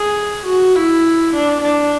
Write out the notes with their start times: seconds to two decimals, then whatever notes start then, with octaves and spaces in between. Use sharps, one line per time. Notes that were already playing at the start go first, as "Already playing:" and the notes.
Already playing: G#4
0.47 F#4
0.76 E4
1.34 D4
1.62 D4